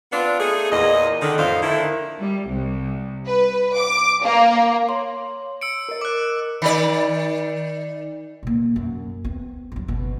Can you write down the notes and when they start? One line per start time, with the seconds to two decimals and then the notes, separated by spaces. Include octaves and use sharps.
0.12 B3 C4 D4 F4
0.40 A3 D#4 G#4
0.72 E2 A#2 D#5
1.22 D3 D#3
1.38 F2 A2 D#3 C5 F5
1.63 D3 D#3 E4
2.19 G3
2.48 C2
3.26 B4
3.77 D6
4.24 A#3
4.89 C#5 C6
5.61 E6 C#7 D7
5.89 A#4 D#5
6.01 D6 F#6
6.62 D#3 D5
8.43 B2 A#3
8.76 F#2
9.24 B3 C4
9.72 G#2 F#3
9.88 G1 B2